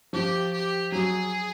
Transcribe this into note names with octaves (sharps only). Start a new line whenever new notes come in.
F3 G4
G4
F#3 G#4